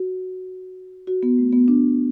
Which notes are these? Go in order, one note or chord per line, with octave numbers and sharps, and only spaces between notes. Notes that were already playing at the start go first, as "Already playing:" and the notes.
Already playing: F#4
F#4
B3
A3
B3
D4